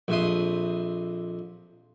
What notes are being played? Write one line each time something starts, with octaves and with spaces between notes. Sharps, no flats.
A#1 F2 E5 C6 D#6